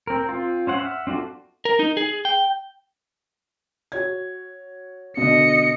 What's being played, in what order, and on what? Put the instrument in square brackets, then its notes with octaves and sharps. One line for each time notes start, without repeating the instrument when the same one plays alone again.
[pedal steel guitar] C4 A#4
C4 F4
C#4 C5 F#5
E5 F#5 C#6 F6
C4 D4 F4 F#4 A4
[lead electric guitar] A#4
D#4
G#4
G5
[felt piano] F#4 C#5 G#6
[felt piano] B2 D3 [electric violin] D#5 C#7